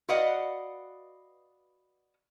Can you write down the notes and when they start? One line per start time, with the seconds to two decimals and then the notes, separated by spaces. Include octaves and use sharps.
0.09 F#4 B4 D5 D#5 F5 F#5